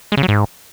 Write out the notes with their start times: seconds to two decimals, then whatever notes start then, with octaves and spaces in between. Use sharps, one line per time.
0.12 G#3
0.17 C#3
0.23 F#3
0.28 G#2